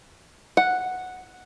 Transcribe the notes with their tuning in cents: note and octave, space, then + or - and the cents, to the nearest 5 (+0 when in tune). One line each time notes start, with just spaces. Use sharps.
F#5 -5